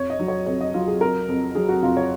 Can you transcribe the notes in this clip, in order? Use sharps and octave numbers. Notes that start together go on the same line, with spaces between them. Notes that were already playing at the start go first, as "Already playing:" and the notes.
Already playing: F2 C#5
D#5
F#3
C#5
F2 C#5
D#5
F#3 F4
G#4
F2 A#4
F2
F#3 G#4
F#4
F2 F4
C#5